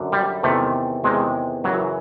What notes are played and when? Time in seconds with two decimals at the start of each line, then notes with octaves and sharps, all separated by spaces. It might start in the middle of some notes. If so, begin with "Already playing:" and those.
Already playing: F#2 D3
0.12 G3
0.43 E2 C3 D#3 A3
1.04 E2 C3 D#3 G#3
1.64 F#2 C#3 E3 F#3